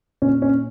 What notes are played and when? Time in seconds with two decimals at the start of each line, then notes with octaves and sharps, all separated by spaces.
0.22 A#2 C#4
0.42 C#4